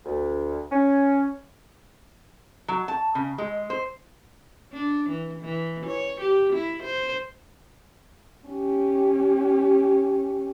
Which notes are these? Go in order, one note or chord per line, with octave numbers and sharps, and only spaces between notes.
D2
C#4
F#3
A5
C#3
G#3
C5
D4
E3
E3
C#5
G4
E4
C5
C#4 G4